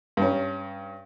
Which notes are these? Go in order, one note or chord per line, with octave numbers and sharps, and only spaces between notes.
G2 C#4